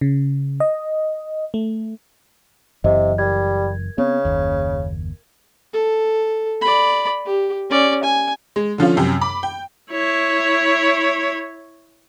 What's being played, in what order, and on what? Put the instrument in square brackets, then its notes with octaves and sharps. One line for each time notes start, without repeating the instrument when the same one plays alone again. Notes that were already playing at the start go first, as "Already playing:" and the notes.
[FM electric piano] C#3
D#5
A3
[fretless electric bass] F#1 F#2 E3 [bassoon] C3 [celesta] D#5
[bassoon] G3 [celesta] A#4 G#6
[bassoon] C#3 [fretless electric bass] B3 C4
[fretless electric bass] F#1 D#2
[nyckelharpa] A4
D5 B5
G4
C#4 D5
G#5
[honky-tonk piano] G#3
D3 F3 C#4 F4
F#2 C3 G5
B5 D6
G5
[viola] E4 C#5